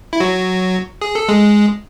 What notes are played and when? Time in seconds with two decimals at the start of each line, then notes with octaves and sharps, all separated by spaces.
0.13 E4
0.20 F#3 F#4
1.01 G#4
1.15 A4
1.28 G#3 G#4